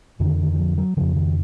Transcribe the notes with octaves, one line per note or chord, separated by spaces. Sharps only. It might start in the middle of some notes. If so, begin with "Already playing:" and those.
F2 D3 D#3
D#3
F3
F#3
F2 C#3 F3
D#3